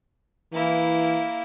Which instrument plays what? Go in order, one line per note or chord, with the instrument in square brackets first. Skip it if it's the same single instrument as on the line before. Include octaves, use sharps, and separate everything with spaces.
[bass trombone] E3 [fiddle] A#3 E4